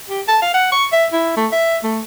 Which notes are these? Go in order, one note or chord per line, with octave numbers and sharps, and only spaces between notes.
G4
A5
F5
F#5
C#6
E5
E4
A3
E5
A3